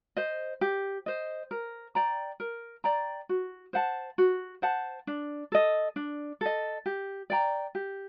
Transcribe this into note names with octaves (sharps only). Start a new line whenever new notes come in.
C5 D#5
G4
C5 D#5
A#4
D5 G5 A#5
A#4
D5 G5 A#5
F#4
C5 F#5 A5
F#4
C5 F#5 A5
D4
A4 D#5
D4
A4 D#5
G4
D5 G5 A#5
G4